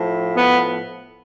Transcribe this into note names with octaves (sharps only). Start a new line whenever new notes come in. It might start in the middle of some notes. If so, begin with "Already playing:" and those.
Already playing: A2 F3
B3